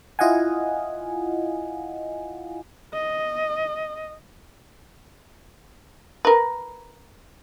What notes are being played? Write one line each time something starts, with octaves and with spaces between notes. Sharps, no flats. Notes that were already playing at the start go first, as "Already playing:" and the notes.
E4 F4 D#5 F5 F#5 G#5
D#5
A#4 B4